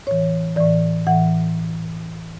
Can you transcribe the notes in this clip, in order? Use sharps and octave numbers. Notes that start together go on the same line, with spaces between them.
A2 E3 C#5
A2 E3 D5
A2 E3 F#5